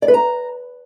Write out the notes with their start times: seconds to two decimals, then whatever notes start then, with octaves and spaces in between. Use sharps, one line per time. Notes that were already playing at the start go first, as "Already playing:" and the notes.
0.02 D5
0.08 B4
0.14 A#5